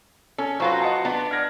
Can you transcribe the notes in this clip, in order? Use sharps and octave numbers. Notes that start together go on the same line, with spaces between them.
C#4 A4
F#3 F4 F#4 B4 C5
D#5 F#5 A5
B3 D4
F6 G#6 A#6